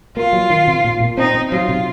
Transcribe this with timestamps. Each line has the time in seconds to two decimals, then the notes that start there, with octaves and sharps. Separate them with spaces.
0.17 A#3 F4
0.33 F#3
0.50 D#3
0.67 C3
0.85 A#2
1.00 A#2
1.17 C4 D#4
1.35 C4
1.52 F#3 F4
1.69 C3